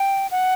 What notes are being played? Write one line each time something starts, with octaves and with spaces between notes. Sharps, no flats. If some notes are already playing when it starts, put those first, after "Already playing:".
Already playing: G5
F#5